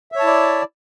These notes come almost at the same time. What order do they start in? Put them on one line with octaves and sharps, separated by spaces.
E5 C#5 A5 E4 D5